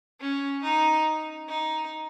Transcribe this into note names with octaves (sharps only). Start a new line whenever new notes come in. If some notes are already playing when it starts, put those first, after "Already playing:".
C#4
D#4
D#4